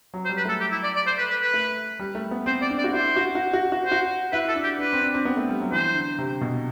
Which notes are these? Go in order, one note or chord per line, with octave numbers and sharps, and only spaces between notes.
F#3
C5
G3
B4
A3 A4
G4
E4
D5
D5
C5
B4
B4
B4
A3
G3
A3
B3
C4 C5
D5
D4
D5
F#4
E4 C5
F#4
F#4
F#4
F#4
C5
F#4
E4 B4
A4
D4
G4
D4 B4
C4
D4
C4
B3
A3
G3
F#3
E3 C5
D3
C3
B2